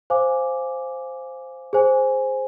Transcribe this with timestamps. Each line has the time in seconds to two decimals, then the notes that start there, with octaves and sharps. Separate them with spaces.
0.10 C5 F5 G#5 D6
1.73 G#4 C5 G#5